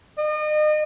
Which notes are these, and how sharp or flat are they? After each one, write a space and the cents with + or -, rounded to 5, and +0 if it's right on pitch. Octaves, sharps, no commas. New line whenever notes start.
D#5 -35